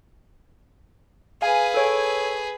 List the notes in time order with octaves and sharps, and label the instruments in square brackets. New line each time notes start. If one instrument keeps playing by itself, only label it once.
[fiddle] G#4 B4 [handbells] F5 G#5
[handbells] A4 C#5